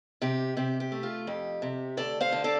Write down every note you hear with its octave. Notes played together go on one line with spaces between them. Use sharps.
C3 G4
C3 G4
G4
A3
F4
F2 G4
C3
D2 A4 D5
C5 F5
D3
A4 D5